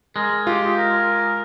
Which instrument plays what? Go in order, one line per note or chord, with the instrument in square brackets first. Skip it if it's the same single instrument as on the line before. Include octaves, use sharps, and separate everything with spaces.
[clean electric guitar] G#3 [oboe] A#4
[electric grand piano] F4 [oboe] G4
[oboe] A#4